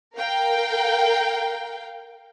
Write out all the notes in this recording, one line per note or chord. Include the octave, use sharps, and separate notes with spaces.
A#4 F5 G5